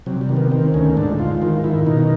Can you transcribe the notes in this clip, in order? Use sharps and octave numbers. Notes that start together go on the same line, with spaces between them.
C3 F#3
G3
D#3
B3
D#3 C4
D2 C#4
G#2 D4
G#2 F4
D#3 F4
D#3 E4
B2 D#4